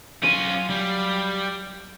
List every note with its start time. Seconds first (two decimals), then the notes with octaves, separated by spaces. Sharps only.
0.23 F#3 C#4 F4 F5 D#7
0.70 G3